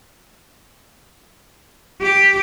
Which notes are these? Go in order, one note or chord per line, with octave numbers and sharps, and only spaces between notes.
G4